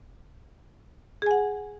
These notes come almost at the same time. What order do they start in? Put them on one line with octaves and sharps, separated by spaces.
G#4 G#5 F#5